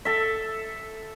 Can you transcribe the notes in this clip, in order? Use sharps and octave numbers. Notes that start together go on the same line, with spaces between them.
A4 E5